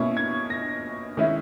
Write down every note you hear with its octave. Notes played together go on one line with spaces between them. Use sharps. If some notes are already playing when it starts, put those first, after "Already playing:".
Already playing: B2 A#3 C#4 E4 C#6
G#6
A#6
D#3 G#3 C#4 E4